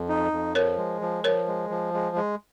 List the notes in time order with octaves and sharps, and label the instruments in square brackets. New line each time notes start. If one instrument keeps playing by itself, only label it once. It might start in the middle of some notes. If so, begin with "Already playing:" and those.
Already playing: [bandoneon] F2
D#4
F2
[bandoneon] F3 [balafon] A#4 C#5
[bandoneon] G#3
F3
[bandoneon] F3 [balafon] A#4 C#5
[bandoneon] G#3
F3
G#3
G#3